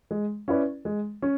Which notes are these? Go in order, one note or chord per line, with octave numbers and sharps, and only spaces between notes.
G#3
C#4 E4 B4 D5
G#3
C#4